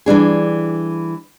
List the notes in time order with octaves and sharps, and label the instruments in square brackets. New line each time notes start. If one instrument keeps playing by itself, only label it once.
[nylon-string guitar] E3 G3 D4 G#4